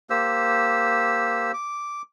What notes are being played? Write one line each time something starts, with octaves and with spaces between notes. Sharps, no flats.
A#3 G4 C5 E6
D6